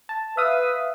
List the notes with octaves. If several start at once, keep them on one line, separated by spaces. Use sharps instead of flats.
A5
B4 E5 F5 D#6